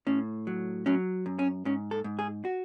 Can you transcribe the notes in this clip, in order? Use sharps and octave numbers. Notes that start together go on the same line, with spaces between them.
A2 C#4
F#3
F#3 C#4
F#2
C#4
G#2 C#4
A4
G#2
G#4
F#4